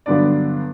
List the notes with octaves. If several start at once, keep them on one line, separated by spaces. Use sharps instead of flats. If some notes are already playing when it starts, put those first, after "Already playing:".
G2 D3 F#3 B3 D4 D5